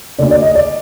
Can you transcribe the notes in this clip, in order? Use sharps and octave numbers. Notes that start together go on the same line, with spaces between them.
D2 D3 D5
D5
D#5
D5